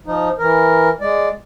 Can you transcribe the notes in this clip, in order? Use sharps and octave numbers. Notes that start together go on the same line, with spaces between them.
F3 D#4
E3 A#4
G#3 D5